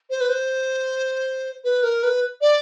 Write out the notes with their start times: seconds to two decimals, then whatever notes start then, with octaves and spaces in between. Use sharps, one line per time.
0.10 C5
0.20 B4
0.29 C5
1.64 B4
1.83 A#4
2.03 B4
2.41 D5